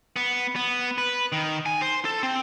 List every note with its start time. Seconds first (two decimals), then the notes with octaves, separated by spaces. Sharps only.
0.16 B3
0.56 B3
0.98 B4
1.32 D#3
1.66 G#5
1.82 C5
2.05 A4
2.23 C4